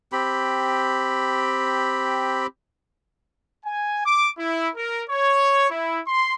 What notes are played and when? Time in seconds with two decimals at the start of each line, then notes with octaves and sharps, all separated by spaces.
0.12 C4 G4 B5
3.65 G#5
4.05 D6
4.39 E4
4.76 A#4
5.10 C#5
5.70 E4
6.07 C6